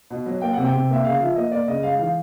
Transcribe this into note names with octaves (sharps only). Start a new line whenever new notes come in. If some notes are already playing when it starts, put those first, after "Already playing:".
B2
F#3
A#3 G5
C3 F#5
G5
C3
A#3 E5
C#3 F5
F3 E5
A#3 D#5
A#3 D5
C#3 D#5
G#3 F5
E3 F5